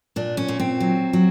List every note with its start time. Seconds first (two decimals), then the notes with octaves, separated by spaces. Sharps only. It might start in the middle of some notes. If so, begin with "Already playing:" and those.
0.16 A#2 D4
0.37 C#4
0.48 A#2
0.60 C4
0.80 F#3
1.13 F#3